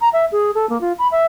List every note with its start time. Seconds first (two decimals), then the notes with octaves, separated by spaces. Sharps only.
0.01 A#5
0.13 E5
0.32 G#4
0.55 A4
0.69 A#3
0.81 F4
0.98 B5
1.11 E5